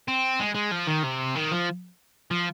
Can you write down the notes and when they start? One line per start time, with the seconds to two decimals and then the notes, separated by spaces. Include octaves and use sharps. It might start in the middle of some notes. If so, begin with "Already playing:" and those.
0.08 C4
0.40 G#3
0.55 G#3
0.72 F3
0.87 D#3
1.04 C3
1.36 D#3
1.51 F3
2.31 F3